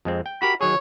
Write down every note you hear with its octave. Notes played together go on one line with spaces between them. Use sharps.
F2 G#3 C4
G5
F#4 G4 A#4 B5
D#3 F#3 G#4 C#5